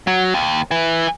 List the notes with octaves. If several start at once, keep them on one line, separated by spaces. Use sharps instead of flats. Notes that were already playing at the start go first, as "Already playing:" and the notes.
F#3
D#2
E3